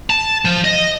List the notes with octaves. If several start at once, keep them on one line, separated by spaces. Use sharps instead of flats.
A5
F3
D#5